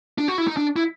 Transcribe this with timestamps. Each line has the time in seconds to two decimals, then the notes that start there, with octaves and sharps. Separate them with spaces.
0.18 D4
0.28 F#4
0.38 E4
0.48 D#4
0.57 D4
0.76 E4